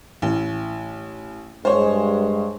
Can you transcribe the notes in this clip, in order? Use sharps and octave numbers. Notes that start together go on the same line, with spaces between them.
A1
G2 G#3 C5 C#5